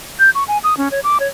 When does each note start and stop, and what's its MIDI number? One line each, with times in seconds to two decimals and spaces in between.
0.19 0.30 91
0.35 0.44 85
0.48 0.58 80
0.64 0.77 87
0.77 0.88 61
0.91 1.00 73
1.04 1.18 86
1.20 1.28 73